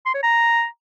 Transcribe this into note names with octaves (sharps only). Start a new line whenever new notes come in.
C6
C#5
A#5